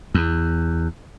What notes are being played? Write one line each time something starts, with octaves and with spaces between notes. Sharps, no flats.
E2